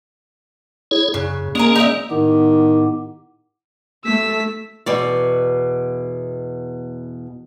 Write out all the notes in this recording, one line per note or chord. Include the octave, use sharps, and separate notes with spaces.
E4 G#4 C#5
F#2 C#3
G#3 A#3 C#4 G#4 A#4
D#4 D#5 E5
A2 D#3 B3 G4
A3 E6 B6
E2 B2 D5